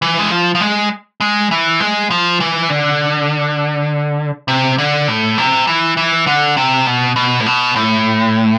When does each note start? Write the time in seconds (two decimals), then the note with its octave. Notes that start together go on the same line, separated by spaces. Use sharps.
0.02 E3
0.19 G#3
0.31 F3
0.55 F3
0.61 G#3
1.20 G#3
1.51 E3
1.80 G#3
2.10 F3
2.40 E3
2.70 D3
4.48 C3
4.78 D3
5.08 A2
5.38 C3
5.67 E3
5.97 E3
6.27 D3
6.57 C3
6.86 B2
7.16 B2
7.40 A2
7.46 B2
7.76 A2